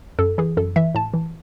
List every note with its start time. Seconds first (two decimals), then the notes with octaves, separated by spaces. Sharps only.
0.19 F#2 A4
0.38 E3 G#4
0.57 F#2 A4
0.76 E3 E5
0.95 A2 A5
1.14 E3